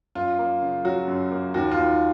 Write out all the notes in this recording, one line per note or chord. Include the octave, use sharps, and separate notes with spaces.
F#2 F4
A#3
C#3
F#3 F#4
F#2
A#3
D#2 F#4
F4
D#2